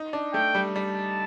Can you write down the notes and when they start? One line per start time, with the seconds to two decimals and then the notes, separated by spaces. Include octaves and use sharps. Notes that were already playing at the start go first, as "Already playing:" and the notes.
Already playing: D#4
0.13 D4
0.34 A3 G5
0.55 G3
0.75 G3 A5